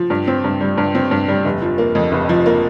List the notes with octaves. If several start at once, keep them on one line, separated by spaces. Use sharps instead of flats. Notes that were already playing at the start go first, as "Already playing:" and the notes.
Already playing: F3
G2
C4
G2
G3
G2
C4
G2
G3
F1
F3
A#3
F2
F1
F3
A#3